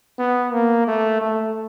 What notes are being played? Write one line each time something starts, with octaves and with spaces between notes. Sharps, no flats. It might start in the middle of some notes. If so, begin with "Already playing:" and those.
B3
A#3
A3
A3